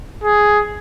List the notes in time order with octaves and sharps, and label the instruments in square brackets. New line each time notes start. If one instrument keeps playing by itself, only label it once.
[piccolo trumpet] G#4